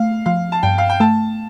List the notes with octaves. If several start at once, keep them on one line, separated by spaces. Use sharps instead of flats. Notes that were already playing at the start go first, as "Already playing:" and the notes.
Already playing: A3 F5
F3 F5
A5
G2 G5
F5
G5
A3 A5